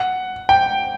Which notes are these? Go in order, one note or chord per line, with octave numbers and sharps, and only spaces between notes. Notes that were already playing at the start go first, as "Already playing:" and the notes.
Already playing: F#5
G5